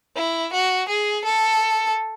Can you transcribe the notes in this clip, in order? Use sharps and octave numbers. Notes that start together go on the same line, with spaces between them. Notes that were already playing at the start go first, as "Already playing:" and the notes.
E4
F#4
G#4
A4